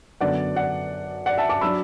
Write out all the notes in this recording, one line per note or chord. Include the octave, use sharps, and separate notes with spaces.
F#2 D3 B3 D4 D5 F#5
D5 F#5
D5 F#5
E5 A5
A5 D6
F#3 D4 B5 E6